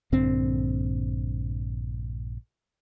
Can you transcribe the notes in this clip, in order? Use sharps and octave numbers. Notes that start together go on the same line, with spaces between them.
A#1 G2 D3 C4